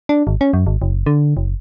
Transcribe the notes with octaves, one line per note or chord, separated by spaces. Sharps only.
D4
G#1
C#4
F#2
G#1
F#1
D3
F#1